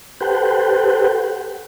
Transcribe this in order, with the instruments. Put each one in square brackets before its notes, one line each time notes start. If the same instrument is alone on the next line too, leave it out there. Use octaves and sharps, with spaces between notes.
[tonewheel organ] G4 A4 B4 C5 F#5 G5